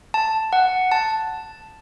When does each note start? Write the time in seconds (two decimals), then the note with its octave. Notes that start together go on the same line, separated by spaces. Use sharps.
0.14 A5
0.53 F#5
0.92 A5